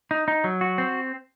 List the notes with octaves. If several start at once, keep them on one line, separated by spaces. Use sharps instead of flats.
D#4
D#4
F#3
F#4
C4